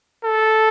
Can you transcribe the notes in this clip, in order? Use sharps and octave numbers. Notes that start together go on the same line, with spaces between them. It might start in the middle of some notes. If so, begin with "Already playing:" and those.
A4